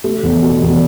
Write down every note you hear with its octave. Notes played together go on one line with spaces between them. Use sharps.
A3
E2
B2
E2